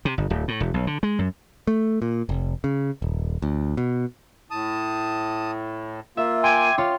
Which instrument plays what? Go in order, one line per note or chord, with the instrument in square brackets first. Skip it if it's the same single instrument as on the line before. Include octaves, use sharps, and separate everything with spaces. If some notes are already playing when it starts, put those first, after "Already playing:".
[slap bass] C3
G1
D1
A2
E1
B1
D3
G#3
F#2
[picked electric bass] A3
A#2
F1
C#3
D#1
D2
B2
[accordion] A2 [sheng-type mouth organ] A5 D#6
[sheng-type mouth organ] A#3 F4 [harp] E5
[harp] G5 C6 D6 [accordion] G#5
[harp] F4 C#5 C6